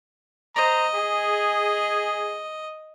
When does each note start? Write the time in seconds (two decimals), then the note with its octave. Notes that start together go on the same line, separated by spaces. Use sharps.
0.56 C5 D#5 A#5
0.95 G#4